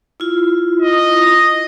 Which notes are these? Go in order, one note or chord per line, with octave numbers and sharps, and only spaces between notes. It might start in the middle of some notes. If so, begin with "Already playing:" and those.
E4 F4
D#5